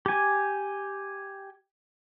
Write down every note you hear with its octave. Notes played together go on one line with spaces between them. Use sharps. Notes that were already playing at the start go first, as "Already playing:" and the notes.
G4 G#5